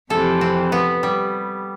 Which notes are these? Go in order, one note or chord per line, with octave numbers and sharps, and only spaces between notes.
F2 C3 E3 A4
C4
B3
G3